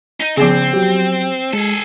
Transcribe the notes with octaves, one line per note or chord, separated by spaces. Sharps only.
D#4
C#3 F3 B3 C4 G#4
F#3 G4
G#3 G#4 A4